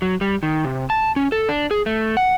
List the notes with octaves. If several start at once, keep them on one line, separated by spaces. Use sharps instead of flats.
F#3
G3
D#3
C3
A5
C#4
A4
D4
G#4
A3
F#5